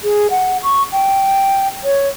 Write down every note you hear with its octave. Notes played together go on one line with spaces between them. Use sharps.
G#4
F#5
C#6
G5
C#5